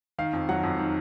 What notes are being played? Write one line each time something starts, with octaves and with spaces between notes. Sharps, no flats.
D#3 F5
F2
F#3 F#5
F2
D#3